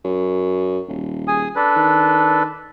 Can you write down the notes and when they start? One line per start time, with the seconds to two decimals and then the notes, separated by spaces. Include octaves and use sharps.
0.04 F#2
0.88 D#1
1.28 G#4 G#5 D#6
1.56 D4 A4 B4
1.76 D#3